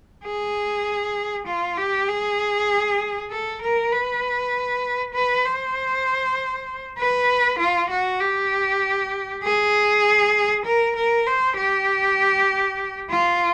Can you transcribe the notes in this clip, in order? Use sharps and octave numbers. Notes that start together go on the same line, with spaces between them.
G#4
F4
G4
G#4
A4
A#4
B4
B4
C5
B4
F4
F#4
G4
G#4
A#4
A#4
C5
G4
F4